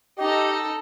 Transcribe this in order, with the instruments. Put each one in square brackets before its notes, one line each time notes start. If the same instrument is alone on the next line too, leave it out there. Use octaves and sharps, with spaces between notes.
[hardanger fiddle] D#4 A4 [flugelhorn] G4 [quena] D#5